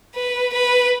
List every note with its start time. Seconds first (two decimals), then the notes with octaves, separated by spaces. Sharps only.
0.15 B4
0.53 B4